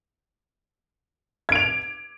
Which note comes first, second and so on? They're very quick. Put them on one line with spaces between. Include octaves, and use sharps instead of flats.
G#6 D7 F7